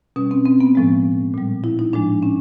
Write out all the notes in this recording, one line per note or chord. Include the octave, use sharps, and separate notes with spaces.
B2 G3 C#4
C4
C4
B3
A2 F3 G#3
A#2 G3
E4
D#4
A2 F3 G#3 D4
C#4